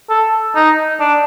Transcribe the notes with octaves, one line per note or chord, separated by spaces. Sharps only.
A4
D#4
D4